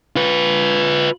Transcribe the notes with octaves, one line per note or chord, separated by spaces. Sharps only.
F4 B4